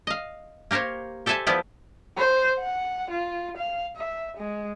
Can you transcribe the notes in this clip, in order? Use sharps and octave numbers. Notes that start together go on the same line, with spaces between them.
D#5 F5
A#3 G4 A#4 C5 C#5
G4 A4 C5 E5 G#5 A5
F3 G3 B3 E4 G4 D5
C5
F#5
F4
F5
E5
G#3